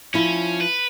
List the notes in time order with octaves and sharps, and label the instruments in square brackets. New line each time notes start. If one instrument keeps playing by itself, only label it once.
[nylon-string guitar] F3 E4 [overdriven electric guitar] C#4
[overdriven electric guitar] B4